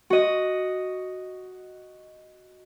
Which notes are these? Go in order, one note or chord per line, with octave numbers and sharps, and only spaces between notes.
F#4 D#5